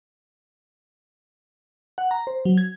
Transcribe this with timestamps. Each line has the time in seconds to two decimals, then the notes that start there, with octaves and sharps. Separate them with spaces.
1.98 F#5
2.11 A#5
2.27 C5
2.45 F#3
2.58 G#6